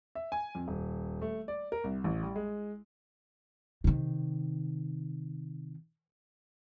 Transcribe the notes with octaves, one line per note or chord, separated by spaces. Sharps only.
E5
G#5
F2
D#1
A3
D5
A#4
C2
A1
G3
G#3
C3 D#3